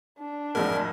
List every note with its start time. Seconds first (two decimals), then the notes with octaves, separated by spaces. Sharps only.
0.19 D4
0.55 G#1 F2 A2 G#4 A#4 D5 G#5